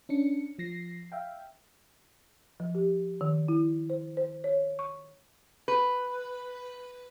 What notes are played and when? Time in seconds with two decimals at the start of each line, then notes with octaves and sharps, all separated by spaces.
0.09 C#4 D4 C#7
0.59 F3 A#6 C7
1.12 E5 F5 G5
2.60 F3
2.75 G4
3.21 D#3
3.48 E4
3.90 C5
4.17 C5
4.44 C#5
4.79 C#6
5.68 B4